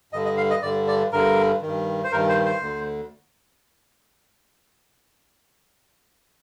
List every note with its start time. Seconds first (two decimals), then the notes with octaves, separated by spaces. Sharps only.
0.13 G2 D3 D#5
0.25 D#5
0.37 F5
0.50 D#5
0.63 G2 D3 D5
0.88 D5
1.12 G2 D3 A#4
1.62 G2 D#3
2.04 C5
2.12 G2 A#4
2.15 D#3
2.29 C5
2.45 C5
2.61 D2 D3